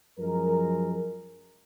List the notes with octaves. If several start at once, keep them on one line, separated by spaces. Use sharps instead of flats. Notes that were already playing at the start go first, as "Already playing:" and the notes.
F#2 F3 G#3 A#4